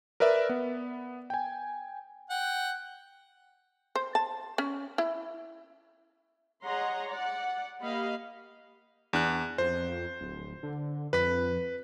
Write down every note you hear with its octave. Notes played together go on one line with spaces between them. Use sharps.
A#4 B4 D5 E5
B3
G5 G#5
F#5 G5
C5
A5
C#4
E4
G#4 C#5 D#5 F#5 A#5 C6
D5 F#5
A#3 G4 D#5 F5 B5
E2 D4 F#6
F2 C5
D1
D3
F2 B4 B6